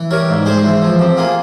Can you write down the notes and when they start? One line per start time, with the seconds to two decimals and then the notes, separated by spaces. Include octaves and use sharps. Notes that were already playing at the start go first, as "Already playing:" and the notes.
Already playing: E3
0.11 G3 A#4 C#5
0.28 G#2
0.46 G#3 G#4 C5
0.64 E3
0.82 F3
0.99 C3
1.17 A#3 F4 G#4